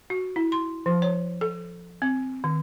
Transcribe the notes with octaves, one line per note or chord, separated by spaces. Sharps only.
F#4
E4
C6
F3
C#5
A4
C4
D#3